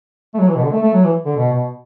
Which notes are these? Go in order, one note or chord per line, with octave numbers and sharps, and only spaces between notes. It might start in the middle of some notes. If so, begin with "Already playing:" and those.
A3
F#3
E3
B2
D3
A3
A3
F#3
E3
D3
B2
B2